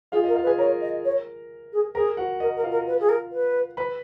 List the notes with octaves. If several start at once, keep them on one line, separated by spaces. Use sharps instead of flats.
F4 G#4 F5
A#4 D#5
F4 F5
B4
G#4 G#5
A#4 C#5 A#5
D#5
C#5
G#4
G#4 A#4 A#5
F#4 F#5
A#4 D#5
A#4
F4 F5
A#4
B4
G#4
A#4
B4
B4 B5